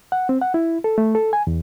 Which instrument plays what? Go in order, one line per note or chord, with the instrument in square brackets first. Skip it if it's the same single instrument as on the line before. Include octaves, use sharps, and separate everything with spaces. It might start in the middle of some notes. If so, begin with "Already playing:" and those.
[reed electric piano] F#5
C4
F#5
E4
A4
A3
A4
G#5
E2